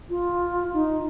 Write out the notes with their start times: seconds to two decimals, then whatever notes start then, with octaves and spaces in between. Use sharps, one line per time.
0.10 F4
0.74 D#4